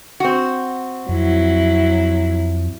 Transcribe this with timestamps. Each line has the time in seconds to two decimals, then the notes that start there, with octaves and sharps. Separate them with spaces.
0.20 C4 F#4
1.09 F2 F#3 E4